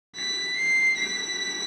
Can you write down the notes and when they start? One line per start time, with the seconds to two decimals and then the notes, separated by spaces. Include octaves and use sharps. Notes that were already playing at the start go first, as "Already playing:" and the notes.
0.16 B6
0.56 C7
0.97 B6